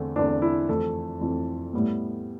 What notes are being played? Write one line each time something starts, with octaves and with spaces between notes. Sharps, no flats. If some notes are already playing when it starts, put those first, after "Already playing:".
Already playing: E2 D3 A3 C4
E2 D3 A3 C4 D4
E4
F2 E3 A3 C4 A4
F2 E3 A3 C4
A2 G3 B3